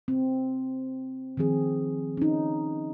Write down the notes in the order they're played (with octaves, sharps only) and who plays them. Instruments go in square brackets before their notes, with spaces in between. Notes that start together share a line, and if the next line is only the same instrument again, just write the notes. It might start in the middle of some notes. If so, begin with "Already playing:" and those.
[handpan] C4
D#3 F3 C4 G#4
C#4 D#4